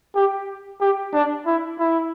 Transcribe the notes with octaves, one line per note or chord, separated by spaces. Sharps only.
G4
G4
D4
E4
E4